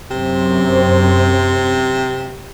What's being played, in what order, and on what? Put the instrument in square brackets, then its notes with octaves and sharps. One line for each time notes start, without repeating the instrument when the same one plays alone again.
[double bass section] F#2 C4 [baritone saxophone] C3